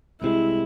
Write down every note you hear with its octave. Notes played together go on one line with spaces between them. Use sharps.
C2 C3 G#3 E4